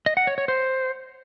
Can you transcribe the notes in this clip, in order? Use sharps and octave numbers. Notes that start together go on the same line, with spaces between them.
D#5
F#5
C#5
C#5
C5